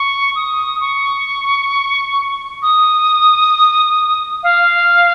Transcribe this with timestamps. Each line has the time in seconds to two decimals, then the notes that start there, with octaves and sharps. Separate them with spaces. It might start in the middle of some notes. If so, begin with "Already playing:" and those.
Already playing: C#6
0.36 D#6
0.81 C#6
2.62 D#6
4.43 F5